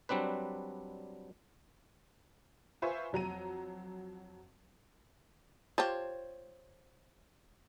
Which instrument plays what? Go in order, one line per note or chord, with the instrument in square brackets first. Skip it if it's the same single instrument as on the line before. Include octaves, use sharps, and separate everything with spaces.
[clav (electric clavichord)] F#3 G3 C4 D4 B4
[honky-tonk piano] F4 B4 C5 E5 G#5 C#6
F2 F#3 A#5 D#7
[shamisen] F4 G4 [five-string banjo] C5 C#5 A5